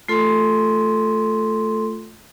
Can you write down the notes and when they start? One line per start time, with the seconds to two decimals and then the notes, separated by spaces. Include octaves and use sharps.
0.08 A3 F4 A4 C6